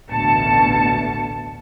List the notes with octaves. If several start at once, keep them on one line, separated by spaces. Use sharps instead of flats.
A1 D2 B2 A5 C#7